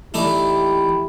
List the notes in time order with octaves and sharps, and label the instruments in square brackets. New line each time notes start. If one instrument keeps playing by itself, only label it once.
[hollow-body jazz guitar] E2 [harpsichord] A3 D#4 D5 [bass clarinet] E4 [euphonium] G4